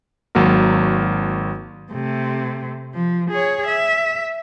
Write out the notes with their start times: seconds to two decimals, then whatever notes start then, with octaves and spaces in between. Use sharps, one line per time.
0.35 G#1 F#3 A#3 F#4 A#4
1.92 C3 A3
2.94 F3
3.31 G#4 C#5
3.67 E5